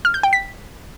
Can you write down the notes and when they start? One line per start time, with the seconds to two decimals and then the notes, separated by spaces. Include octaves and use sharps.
0.05 F6
0.14 G6
0.23 G5
0.33 B6